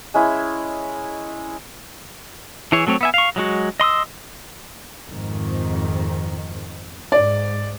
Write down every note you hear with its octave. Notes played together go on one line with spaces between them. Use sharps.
G#3 C#4 E4
E3 E4 G#4 C#5
F#3 A3 C4 C#5
B3 E5 G#5
F5 C#6
F#3 G#3 F#4
D#5 C6 D#6 E6
F2 G#2 D#3
G#2 D5